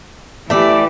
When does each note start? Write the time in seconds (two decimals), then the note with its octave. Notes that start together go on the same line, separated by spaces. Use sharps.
0.50 E3 A3 G4 D5